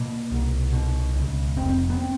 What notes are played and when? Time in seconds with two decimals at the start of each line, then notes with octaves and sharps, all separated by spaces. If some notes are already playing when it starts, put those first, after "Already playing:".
Already playing: B2 A#3
0.31 C2
0.73 B2
1.15 C#2
1.57 F1 C4
1.90 B3
1.99 C4